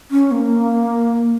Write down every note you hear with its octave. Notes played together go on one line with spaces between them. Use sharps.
C#4
A#3